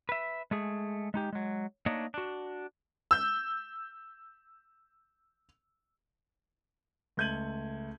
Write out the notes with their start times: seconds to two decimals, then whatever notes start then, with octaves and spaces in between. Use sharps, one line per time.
0.09 B4 E5
0.51 G#3 A3 G#4
1.14 G#3 D#4 G4
1.33 F#3 G#3
1.86 A3 A#3 D4 D#4 C#5 D#5
2.14 D4 F#4
3.11 E6 G6
7.17 C#2 A3 G6 G#6 D#7 F#7